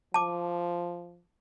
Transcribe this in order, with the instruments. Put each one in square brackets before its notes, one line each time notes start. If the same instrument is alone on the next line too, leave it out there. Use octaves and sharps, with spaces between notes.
[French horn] F3 [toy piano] A5 D6